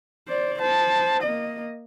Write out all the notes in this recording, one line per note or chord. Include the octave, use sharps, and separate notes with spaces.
C5 D5
C5 A5
A#3 D#5